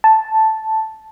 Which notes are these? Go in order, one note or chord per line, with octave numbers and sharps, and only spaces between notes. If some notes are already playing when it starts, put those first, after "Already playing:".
A5